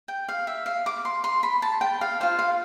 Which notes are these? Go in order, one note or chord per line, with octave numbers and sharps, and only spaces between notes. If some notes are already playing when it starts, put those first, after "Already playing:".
G5
F5
E5
F5
D6
C6
C6
B5
A5
G5
F5
F4 C5 F5
F5